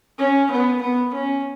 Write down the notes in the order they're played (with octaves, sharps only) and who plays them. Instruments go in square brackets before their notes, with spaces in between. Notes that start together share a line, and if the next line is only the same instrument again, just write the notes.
[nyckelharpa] C#4
B3
B3
C#4